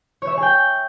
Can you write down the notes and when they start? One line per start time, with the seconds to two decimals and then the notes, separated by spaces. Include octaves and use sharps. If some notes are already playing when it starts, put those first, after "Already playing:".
0.22 C#5
0.27 E5
0.32 C#5
0.37 G#4
0.42 G5